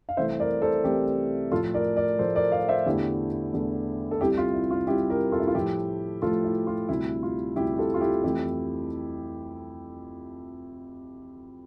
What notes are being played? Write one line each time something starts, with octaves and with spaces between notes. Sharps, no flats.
F5
C2 C3 E3 A3 C5 E5
A#4 D5
A4 C5
C2 C3 E3 A3 G4 A#4
A2 F3 A3 F4 A4
A#4 D5
A#4 D5
A2 F3 A3 A4 C5
A#4 D5
D5 F5
C5 E5
E2 D3 A3 E4 G4
E2 D3 A3
A4
C2 C3 G3 E4 G4
F4
E4
F4
C2 C3 G3 E4 G4
G4 A#4
F4 A4
E4
F4
A2 F3 A3 E4 G4
A2 F3 A3 F4 A4
E4
F4
D2 C3 G3 E4
F4
D2 C3 G3 E4 G4
G4
F4 A4
F4
E4 G4
F2 E3 A3 E4 G4